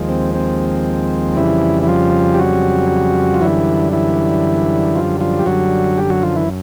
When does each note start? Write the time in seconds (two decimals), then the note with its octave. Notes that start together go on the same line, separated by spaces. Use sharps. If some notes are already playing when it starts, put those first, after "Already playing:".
Already playing: D#2 F3 G#3
0.09 C4
0.35 C4
1.37 F2 C#3 E3 G3 E4
1.83 E4
1.88 F3 F4
2.34 G4
2.39 F#3 F#4
3.34 F4
3.41 F#2 D3 E3 G3 E4
3.93 E3 E4
4.95 F3 F4
5.21 F3 F4
5.39 G4
5.46 F#2 D3 F#3 G3 F#4
5.97 G3 G4
6.10 F#3 F#4
6.23 F3 F4
6.35 E3 E4